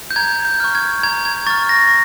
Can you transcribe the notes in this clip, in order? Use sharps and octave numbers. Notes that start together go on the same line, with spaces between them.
G6
A#5 G#6
G6
C#6 F6
G#6
A#5 G#6
G#6
C#6 F6 A6
A#6